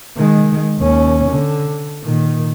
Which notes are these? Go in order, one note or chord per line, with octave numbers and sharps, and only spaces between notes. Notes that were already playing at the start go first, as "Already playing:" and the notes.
D#3 G#3
D#2 C#4
D3
A#2 D#3